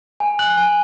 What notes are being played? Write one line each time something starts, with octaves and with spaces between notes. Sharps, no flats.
G#5
F#6 F#7
G#5